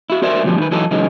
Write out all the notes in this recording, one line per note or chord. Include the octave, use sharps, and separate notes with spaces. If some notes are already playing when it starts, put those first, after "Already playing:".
E4 F#4
F#4 A#4 C5 D5 E5
D2 G2 B2 F3 G3
D#3 B4
E3 F#3 D#4 A4
C#3 E3 F#3 G#3 D#4